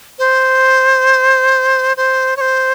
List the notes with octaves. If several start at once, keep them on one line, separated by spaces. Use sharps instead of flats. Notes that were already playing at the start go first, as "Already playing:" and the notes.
C5
C5
C#5
C5